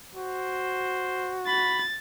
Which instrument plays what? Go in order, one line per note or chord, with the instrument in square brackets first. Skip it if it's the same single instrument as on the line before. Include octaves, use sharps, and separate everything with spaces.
[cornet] F#4 [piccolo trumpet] C5
[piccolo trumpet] B5 [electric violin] A6